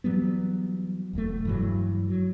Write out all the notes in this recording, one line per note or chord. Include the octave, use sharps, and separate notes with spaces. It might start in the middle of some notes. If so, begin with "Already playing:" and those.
E3 F#3 G3 B3
E1 E2 E3 A3
G2 E3 F#3
F#3